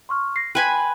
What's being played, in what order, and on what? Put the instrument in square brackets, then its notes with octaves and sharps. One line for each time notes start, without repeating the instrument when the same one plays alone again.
[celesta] C6 C#6 F6
A#6 C7
[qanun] B4 G#5 B5 [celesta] G5 C6 G#6